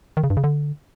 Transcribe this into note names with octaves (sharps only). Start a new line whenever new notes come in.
D#3
C#3
G2
C#3
D3